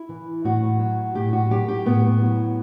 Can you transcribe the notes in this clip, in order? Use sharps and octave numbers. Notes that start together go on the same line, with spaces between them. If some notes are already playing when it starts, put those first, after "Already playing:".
Already playing: E4
E3
A2 F#4
F#3
A2 G4
F#4
F#3 G4
G4
A2 B3
F#3